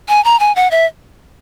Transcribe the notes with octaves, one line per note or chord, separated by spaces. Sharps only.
G#5
A#5
G#5
F#5
E5